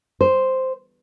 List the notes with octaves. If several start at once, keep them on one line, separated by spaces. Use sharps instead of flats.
C5